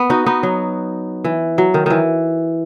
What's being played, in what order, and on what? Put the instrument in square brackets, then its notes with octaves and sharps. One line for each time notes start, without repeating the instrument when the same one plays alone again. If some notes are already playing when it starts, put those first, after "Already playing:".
Already playing: [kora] B3
D#4 F#4
B3 D#4
F#3
E3
F#3
D#3
D#3 E3